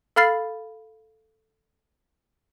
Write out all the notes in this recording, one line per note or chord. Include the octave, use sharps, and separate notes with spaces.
A4 F5 B5 F6 A6 C7